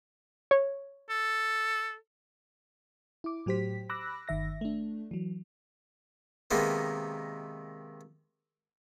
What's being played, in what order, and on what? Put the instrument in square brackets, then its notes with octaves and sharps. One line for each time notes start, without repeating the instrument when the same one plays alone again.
[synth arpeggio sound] C#5
[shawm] A4
[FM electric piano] E4 D6
A2 F#3 G4 C5 B6
B5 D6 E6 F#6 A#6
G1 D#3 E5 A#6
A3 D4
E3 F#3
[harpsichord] C3 D#3 G#3 A#3 B3